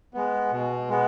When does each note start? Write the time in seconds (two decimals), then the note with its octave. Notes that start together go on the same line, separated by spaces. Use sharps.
0.14 G#3 B3
0.52 B2
0.89 G#3 B3